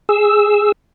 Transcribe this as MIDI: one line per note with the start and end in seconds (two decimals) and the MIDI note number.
0.09 0.72 68
0.09 0.72 88